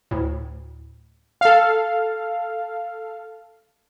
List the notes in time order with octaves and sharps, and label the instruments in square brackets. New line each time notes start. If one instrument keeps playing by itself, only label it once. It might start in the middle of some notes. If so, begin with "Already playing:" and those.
[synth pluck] D2 A2
[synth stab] A4 F5